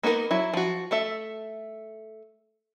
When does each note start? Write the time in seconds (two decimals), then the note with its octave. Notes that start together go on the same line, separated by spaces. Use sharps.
0.03 A#3 B3 D#4 F#4 A#4
0.31 F#3 E4
0.54 F3 F#4
0.91 A3 A4 E5